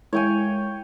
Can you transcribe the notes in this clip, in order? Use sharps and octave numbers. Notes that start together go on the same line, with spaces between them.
G#3 E4 A#4 C#5 G5 G#5